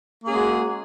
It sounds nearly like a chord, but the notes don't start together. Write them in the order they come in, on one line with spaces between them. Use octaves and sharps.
A#3 G#4 C#4 G#3 F#4